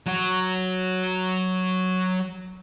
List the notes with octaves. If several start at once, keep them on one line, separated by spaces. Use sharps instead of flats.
F#3 F#4